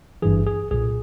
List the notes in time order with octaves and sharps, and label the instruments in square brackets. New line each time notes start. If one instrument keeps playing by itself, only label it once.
[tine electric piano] G#1 G2 E3 G#4
G#4
B1 A#2 G#4